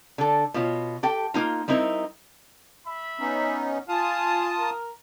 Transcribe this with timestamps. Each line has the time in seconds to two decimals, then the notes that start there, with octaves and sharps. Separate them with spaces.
0.18 D3 A4
0.54 B2 F4 C#5
1.03 G4 A4 G5
1.34 A#3 D#4 F4
1.68 G3 C4 D#4 E4 A#4
2.87 E5 B5
3.19 B3 C#4 D#4
3.89 F4 F5 G#5 A5 D#6
4.58 A#4